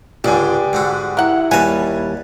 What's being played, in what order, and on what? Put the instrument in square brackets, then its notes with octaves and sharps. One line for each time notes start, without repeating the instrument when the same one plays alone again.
[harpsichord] C#2 G#2 D3 [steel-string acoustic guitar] G4 [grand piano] D5 G#5
[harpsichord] G#2 D3 F#4
[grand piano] E4 [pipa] A#4 F#5
[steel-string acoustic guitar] D#2 G3 [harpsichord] B4 A5 [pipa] G#5